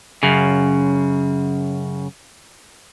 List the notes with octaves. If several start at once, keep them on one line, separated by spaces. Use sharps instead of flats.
F#2 C#3